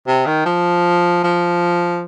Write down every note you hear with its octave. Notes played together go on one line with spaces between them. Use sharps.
C3
D#3
F3
F3